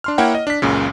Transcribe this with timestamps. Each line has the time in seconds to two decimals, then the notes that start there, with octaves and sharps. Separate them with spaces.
0.04 D4 C6 F6
0.18 A#3 E4 C#5 F#5 G5
0.35 D#5
0.47 D4 B6
0.62 C#2 F#2 A#2 C#3